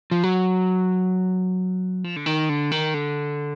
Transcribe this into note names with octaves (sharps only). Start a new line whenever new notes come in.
F3
F#3
F3
D3
D#3
D3
D#3
D3